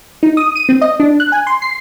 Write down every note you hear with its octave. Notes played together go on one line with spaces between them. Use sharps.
D#4
D#6
D#7
C4
D#5
D4
F#6
G#5
C6
C7